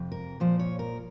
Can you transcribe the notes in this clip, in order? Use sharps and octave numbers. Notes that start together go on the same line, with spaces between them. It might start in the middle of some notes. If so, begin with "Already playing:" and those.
Already playing: F2 C3
A#4
A#2 F3 C5
C#5
A#4